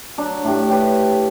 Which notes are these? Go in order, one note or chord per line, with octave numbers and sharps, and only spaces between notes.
F#3 D4
A2 D4 G4
G4 B4